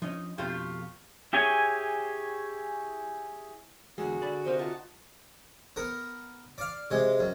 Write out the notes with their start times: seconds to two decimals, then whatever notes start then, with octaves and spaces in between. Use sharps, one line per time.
0.02 F3 C#4 D#4 D#5
0.38 F2 B2 A3 F4 G4
1.33 E4 G4 G#4 C#5 G#5
3.98 E2 D3 G#3 F#4 G#4
4.21 D3 D5 B5
4.45 C3 D#4 A#4 C5
4.59 F4 A5 C#6
5.76 B3 A#4
6.58 D5 F5
6.91 C3 G#3
7.20 F#2